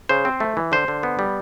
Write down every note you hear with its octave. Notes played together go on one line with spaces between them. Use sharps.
C#3 C5
C4
A3
E3
D3 C5
D3
B3
G3